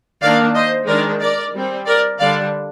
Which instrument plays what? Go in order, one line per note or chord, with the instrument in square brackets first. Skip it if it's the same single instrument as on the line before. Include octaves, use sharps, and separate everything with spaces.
[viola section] D#3 A#3 D4 D5 F5
C5 D#5
D#3 G#3 D4 A#4 D5
A#4 D5
G3 C4
A#4 D5
D3 G3 D4 D5 F5